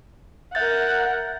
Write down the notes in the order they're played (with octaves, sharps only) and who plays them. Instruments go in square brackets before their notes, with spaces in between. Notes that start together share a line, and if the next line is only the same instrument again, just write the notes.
[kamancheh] A#4 F#5 [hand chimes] E5 G6 A6